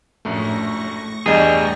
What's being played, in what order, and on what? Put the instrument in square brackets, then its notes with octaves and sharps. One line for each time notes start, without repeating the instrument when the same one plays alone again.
[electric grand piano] A#1 F#2 A3 [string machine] A2 C#6 A#6
[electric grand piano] E2 G2 D#5 [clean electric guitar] G3 G#4